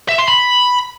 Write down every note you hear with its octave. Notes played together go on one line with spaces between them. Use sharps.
E5
C6
B5